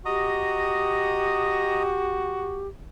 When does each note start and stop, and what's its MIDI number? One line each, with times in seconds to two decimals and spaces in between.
0.06 2.64 66
0.06 2.68 67
0.06 1.83 75
0.06 1.83 82
0.06 1.83 87